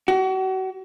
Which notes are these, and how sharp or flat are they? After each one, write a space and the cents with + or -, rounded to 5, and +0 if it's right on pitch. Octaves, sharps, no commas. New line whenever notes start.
F#4 +35